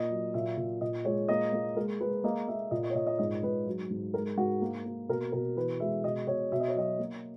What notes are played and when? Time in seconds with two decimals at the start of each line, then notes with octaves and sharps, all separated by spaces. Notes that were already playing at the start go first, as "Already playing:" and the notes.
Already playing: A#2 A#3 D#5
0.10 F#3
0.34 A#2 E5
0.57 A#2
0.81 A#2 D#5
1.05 G#3 C#5
1.28 A#3 D#5
1.53 A#3
1.76 G#3 A#4
2.00 G#3 B4
2.24 A#3 D#5
2.48 A#3 E5
2.71 A#2 D#5
2.83 D#5
2.90 C#5
2.95 A#2 D#5
3.07 D#5
3.18 G#2 D#5
3.43 G#2 B4
3.66 F#3
3.90 G#2
4.14 G#3 A#4
4.37 G#2 F#4
4.62 A#3
4.85 A#3
5.09 B2 A#4
5.32 B2 A#4
5.57 E3 B4
5.80 G#3 E5
6.04 B2 D#5
6.27 B2 C#5
6.52 B2 E5
6.60 D#5
6.68 C#5
6.75 F#3 D#5
6.99 A#3